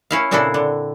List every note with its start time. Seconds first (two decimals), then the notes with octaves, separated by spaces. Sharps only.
0.11 C#4 E4 F5
0.31 A#2 C#3 C4 D4 E4 A4
0.54 D3